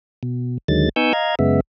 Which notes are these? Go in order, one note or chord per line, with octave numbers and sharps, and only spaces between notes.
B2
D#2 D3 D#3 F#3 G#3 A6
B3 D#4 G#5 C#6 E6 G6
D#5 F5 A#5 G#6
F#2 C#3 G#3 B3 E5